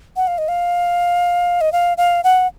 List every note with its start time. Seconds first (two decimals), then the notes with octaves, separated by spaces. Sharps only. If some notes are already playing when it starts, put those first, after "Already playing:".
0.16 F#5
0.27 F5
0.38 D#5
0.48 F5
1.61 D#5
1.72 F5
1.97 F5
2.24 F#5